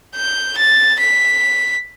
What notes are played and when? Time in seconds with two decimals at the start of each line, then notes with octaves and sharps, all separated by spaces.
0.16 G6
0.57 A6
0.99 B6